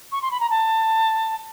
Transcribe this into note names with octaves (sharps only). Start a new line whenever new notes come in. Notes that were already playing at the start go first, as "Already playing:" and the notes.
C#6
C6
B5
A#5
A5